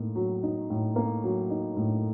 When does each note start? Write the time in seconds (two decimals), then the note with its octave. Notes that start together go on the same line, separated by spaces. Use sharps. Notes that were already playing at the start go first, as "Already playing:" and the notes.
Already playing: A2 A#3 D#4
0.16 F#3
0.43 D#4
0.70 A2
0.96 A#3
1.24 F#3
1.50 D#4
1.77 A2